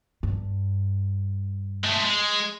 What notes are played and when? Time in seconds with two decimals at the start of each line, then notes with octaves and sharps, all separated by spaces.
0.23 G2
1.84 G#3 A3
2.05 G#3